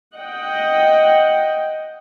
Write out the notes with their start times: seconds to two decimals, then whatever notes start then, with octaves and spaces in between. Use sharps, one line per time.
0.15 D#5 F#5 G5